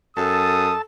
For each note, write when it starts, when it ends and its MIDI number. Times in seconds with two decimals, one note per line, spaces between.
0.17 0.74 42
0.17 0.81 69
0.17 0.82 81
0.17 0.77 87